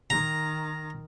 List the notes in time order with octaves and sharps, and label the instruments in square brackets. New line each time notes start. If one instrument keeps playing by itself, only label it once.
[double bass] D#3 [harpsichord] A#5